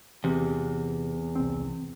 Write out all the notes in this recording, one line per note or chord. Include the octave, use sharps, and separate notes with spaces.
E2 C3
C2 C4